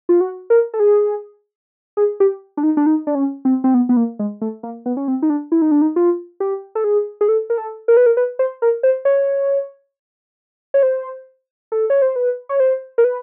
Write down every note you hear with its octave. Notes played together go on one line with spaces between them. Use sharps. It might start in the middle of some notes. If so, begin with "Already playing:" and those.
F4
F#4
A#4
A4
G#4
G#4
G4
D4
D#4
D4
D#4
D4
C#4
C4
C4
B3
B3
A#3
G#3
A3
A#3
B3
C#4
C4
D#4
D4
E4
D#4
D4
D#4
F4
G4
A4
G#4
G#4
A4
A#4
A4
A#4
B4
A#4
B4
C5
A#4
C5
C#5
C#5
C5
A4
C#5
C5
B4
C#5
C5
A#4
B4